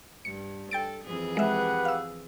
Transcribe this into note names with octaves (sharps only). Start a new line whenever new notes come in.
G2 C#7
A4 G5 A6 D7
F2 E3 G#4
G#3 G4 B4 E5 F#5
F5 E6